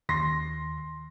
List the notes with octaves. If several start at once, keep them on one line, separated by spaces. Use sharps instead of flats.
D#2 C6 A#6